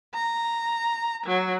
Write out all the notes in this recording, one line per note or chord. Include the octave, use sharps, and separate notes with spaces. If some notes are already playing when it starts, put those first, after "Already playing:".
A#5
F#3